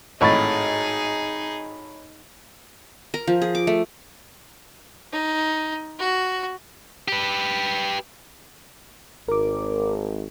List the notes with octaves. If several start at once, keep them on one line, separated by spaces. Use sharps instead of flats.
G#1 A2 D#4 G#4 C#5 B5 C#6 A6
A#4
F3
G#4
D6
A3
D#4
F#4
G4 B4
G#1 A#4 D6